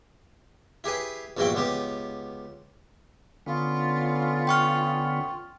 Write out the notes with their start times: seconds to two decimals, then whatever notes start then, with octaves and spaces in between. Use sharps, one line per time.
0.84 E4 G4 G#4 B4
1.37 A#1 E2 G2 E4 F#4 G5
1.55 C#2 B3 G4
3.46 D3 B3 C#4 F4
4.47 G5 C#6 F6